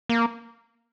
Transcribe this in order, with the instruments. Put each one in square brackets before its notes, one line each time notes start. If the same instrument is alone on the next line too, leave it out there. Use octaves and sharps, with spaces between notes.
[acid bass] A#3